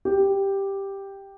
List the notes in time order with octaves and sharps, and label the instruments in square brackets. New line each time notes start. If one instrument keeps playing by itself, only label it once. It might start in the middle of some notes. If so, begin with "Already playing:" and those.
[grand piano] G4